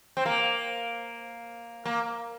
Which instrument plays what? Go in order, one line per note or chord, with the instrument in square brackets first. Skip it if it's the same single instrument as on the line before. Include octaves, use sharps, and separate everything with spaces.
[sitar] C4
A#3
A#3